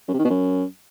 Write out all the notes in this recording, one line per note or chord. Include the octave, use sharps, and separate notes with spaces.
F#2
C3
D#3
B2
F#2